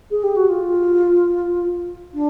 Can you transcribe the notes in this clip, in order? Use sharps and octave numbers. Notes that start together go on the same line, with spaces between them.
G#4
G4
F#4
F4
D4